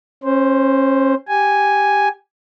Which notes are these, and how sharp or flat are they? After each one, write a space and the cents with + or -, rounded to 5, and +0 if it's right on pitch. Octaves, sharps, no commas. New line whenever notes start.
C#4 -30 C5 +0
G4 +0 G#5 +0